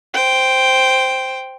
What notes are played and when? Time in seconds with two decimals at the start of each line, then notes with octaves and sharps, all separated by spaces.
0.14 C5 G5